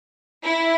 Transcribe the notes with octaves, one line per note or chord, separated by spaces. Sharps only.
E4